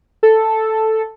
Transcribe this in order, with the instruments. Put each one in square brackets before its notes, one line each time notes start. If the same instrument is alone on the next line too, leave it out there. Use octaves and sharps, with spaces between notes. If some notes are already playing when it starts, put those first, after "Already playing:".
[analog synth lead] A4